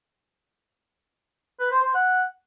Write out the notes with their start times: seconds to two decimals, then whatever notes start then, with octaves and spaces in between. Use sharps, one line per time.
1.59 B4
1.71 C5
1.83 C5
1.94 F#5